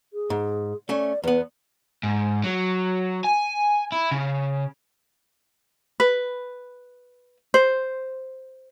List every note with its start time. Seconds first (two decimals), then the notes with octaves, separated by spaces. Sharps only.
0.13 G#4
0.30 G#2
0.89 A3 C#4 D5
1.24 E2 B3 B4
2.03 G#2
2.44 F#3
3.24 G#5
3.92 E4
4.12 C#3
6.00 B4
7.54 C5